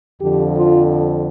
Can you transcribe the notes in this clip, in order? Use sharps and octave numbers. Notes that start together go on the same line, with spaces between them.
F2 D3 F3 G4
F4